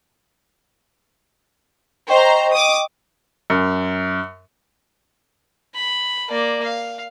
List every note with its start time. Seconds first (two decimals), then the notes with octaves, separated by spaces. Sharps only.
2.09 C5 D#5 G5 A#5 C#6
2.53 D6 D#6
3.50 F#2
5.75 B5
6.30 A#3 D5
6.63 F5